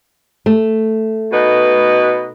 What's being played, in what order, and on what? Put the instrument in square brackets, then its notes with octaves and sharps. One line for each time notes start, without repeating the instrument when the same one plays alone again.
[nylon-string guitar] A3
[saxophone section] B2 D#4 B4